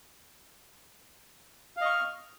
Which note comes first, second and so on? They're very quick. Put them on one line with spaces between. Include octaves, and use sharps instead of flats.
F5 D#5 C#6 F6